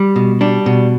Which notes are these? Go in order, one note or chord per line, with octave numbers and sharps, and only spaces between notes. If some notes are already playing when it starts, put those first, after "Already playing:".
Already playing: G3
B2
G3 D4
B2